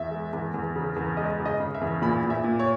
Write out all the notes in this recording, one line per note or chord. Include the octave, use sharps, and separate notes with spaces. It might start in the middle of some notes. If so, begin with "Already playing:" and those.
Already playing: E2 E5
G#3
E2
E2
C#3
E2
G#3 D#5
C#3
D#5
C#3
E5
E2
A#2 B5
A#2
E5
A#2
C#5